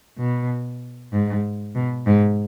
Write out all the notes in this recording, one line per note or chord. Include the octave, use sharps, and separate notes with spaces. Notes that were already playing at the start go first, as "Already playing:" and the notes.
B2
G#2
B2
G#2